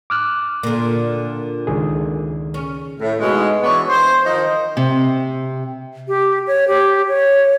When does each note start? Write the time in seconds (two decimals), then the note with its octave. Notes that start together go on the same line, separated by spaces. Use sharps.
0.10 D6 F6 F#6
0.63 A#2 D3
1.67 C#2 D#3 G#4
2.54 C#4
3.00 A2
3.19 G#2 B2 G#3
3.63 E3 B3 D4 C#5
3.89 C5
4.26 D#3 F3 D#4
4.77 C3
6.08 G4
6.47 C#5
6.68 G4
7.08 C#5